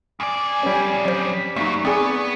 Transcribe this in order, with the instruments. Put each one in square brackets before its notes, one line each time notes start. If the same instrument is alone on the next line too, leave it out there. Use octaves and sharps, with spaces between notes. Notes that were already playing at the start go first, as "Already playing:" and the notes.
[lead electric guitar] F2 D5 [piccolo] G#5
[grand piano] G3 C#4
[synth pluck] F#3 C5
[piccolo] B6
[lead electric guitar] F#2 [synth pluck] A3 A#3 D#4 [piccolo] C#6
[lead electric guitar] B3 [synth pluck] C4 G#4 [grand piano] D5 G#5